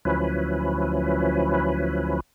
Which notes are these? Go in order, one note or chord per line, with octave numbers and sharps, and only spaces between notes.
D2 F3 F#3 C#4 E4 B4